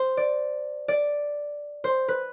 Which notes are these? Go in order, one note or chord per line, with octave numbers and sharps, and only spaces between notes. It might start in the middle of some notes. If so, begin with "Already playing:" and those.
Already playing: C5
D5
D5
C5
B4